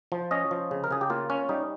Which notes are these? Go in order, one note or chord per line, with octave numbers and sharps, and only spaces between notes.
F3
C#4 D#5
F3
C#3
A#4
C#3 G#4
G4
A#3 F4
C#4
G3 D#4